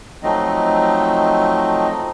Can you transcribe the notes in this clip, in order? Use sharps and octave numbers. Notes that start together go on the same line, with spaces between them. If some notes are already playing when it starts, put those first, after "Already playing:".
F3 F#3 A3 C4 D#4 D#5